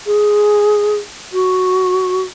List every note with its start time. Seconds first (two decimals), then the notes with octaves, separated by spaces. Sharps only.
0.06 G#4
1.32 F#4